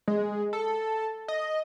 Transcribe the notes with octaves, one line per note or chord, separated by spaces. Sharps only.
G#3
A4
D#5